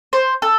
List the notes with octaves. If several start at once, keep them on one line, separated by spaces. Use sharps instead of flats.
C5
A4